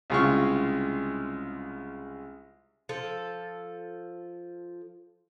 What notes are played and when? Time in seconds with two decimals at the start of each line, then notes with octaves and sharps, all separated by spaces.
0.10 C2 C#3 G#3 F4 F5 C#6
2.89 F3 A4